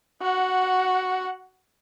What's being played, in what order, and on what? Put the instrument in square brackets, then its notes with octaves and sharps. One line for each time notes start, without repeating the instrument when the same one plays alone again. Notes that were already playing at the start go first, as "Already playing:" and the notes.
[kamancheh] F#4 F#5